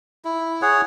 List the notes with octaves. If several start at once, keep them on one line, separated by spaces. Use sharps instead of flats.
E4
G#4 C#5 F#5